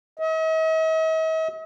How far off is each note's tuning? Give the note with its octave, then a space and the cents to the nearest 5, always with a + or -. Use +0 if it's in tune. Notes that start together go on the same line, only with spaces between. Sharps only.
D#5 +45